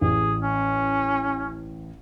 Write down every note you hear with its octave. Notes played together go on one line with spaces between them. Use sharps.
A1 G#4
C#4